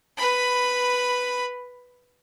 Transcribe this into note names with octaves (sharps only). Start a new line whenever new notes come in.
B4 B5